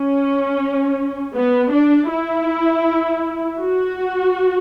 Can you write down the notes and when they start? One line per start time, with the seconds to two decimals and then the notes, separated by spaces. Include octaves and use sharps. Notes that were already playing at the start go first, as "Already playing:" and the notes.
Already playing: C#4
1.36 B3
1.74 D4
2.11 E4
3.61 F#4